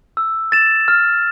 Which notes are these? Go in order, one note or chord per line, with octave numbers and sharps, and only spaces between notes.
E6
A6 E7
F6